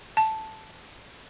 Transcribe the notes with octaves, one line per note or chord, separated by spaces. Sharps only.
A5